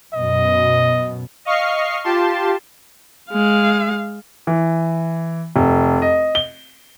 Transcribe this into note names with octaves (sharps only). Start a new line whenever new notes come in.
F#2 B2 D#5
D#5 F5 C#6 F6 C7
F4 G4 A5 C6
G#3 F5
E3
F1
D#5
G7